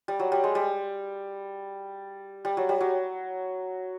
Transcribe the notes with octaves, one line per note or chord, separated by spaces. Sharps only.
G3
F#3
G3
G#3
G3
G3
F#3
G3
F#3